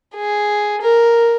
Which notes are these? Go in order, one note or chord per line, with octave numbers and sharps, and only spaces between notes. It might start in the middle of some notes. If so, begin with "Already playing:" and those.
G#4
A#4